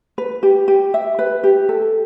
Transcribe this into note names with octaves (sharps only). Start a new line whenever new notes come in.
B4
G4
G4
E5
B4
G4
A4